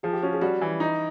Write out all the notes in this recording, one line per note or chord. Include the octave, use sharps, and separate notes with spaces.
F3 G#4
G4
C#4 F#4
G#4
G3 F#4
E3
D#4